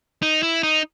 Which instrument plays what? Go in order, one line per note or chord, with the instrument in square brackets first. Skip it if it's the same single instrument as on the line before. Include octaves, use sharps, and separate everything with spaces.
[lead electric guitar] D#4
E4
D#4